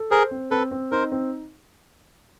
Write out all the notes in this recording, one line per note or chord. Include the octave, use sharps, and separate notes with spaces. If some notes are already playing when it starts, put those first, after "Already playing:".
Already playing: A4
G#4 A#4 C5
C4
C4 A4 B4
C4
D#4 A#4 C5
C4